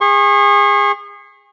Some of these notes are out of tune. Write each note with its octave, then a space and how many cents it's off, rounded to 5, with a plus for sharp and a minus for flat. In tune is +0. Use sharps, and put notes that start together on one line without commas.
G#4 -30 C#6 -35